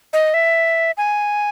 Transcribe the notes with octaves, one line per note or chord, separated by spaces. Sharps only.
D#5
E5
G#5